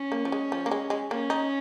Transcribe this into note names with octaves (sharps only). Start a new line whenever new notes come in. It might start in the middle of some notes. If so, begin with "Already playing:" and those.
Already playing: C#4
A#3
F3
G#3
F3
A#3
G#3
G#3
A#3 C#4
D#4